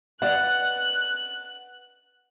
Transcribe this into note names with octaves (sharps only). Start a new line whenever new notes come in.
B4 D5 D#5 F#5 F#6